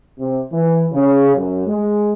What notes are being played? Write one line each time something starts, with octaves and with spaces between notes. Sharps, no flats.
C3
E3
C#3
F#2
G#3